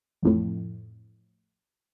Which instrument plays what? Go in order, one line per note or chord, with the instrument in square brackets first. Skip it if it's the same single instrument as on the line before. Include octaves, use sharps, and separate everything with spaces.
[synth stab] A1 F2 A2